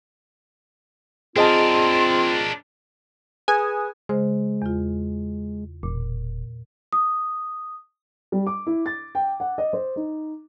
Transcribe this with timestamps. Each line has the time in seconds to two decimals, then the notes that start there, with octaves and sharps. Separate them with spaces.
1.36 C4 D4 F4 G#4 A#4 D#5 A5 C6
3.48 G#4 B4 G#5 D#6
4.09 C#3 G#3 C5
4.62 E2 F4
5.83 E1 A#2
6.93 D#6
8.32 G3
8.47 D6
8.67 E4
8.86 A6
9.15 G5
9.40 F#5
9.58 D#5
9.73 C5
9.96 D#4